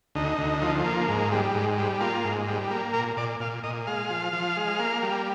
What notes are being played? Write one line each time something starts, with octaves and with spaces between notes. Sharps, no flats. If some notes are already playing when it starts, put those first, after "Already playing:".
D2 D#4
D2
F3
A#3
G#2
G3
G#2
G3
A#3 F4
G#2
G3
A#3
A#2 A#4
A#2 D5
A#2 F5
A#2 D#5
G#3 F5
F3
F3
G#3
A#3
G3